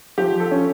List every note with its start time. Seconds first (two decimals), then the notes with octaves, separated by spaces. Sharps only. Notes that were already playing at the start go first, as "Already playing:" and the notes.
0.18 F3 G4
0.40 A4
0.51 C#4